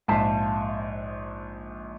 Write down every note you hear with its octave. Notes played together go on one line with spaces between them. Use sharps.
A#1 G#2 E5 F5 A5